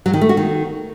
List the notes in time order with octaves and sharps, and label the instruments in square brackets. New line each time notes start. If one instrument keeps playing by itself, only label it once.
[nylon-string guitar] F#3
D#3
A3
F#4
D#3